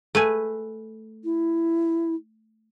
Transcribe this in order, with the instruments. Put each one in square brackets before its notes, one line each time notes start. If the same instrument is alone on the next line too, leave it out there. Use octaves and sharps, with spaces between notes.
[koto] A3 B4 G#5
[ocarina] E4